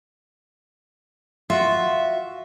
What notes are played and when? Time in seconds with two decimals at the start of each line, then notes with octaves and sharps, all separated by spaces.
1.50 F4 F#4 E5